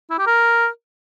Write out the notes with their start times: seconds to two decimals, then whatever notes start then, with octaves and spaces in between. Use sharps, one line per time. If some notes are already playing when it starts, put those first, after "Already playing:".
0.10 E4
0.19 G4
0.27 A#4